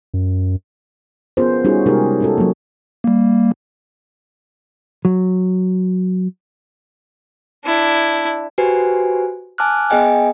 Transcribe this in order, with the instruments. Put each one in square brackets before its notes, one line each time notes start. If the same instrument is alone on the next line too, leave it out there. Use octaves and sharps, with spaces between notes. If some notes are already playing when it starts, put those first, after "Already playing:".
[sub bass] F#2
[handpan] B3 C#4 F4 G#4 A#4 C5
G3 C#4 D#4 F4 F#4 G#4
C3 G#3 D#4 G4 G#4 A#4
C#4 F#4 A4
F#3 A#3
[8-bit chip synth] G3 A#3
[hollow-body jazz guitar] F#3
[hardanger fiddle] D4 E4
[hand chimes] F#4 G4 B4 C5 G#5
G#5 A5 D6 F6 F#6
B3 G#4 D#5 G5 G#5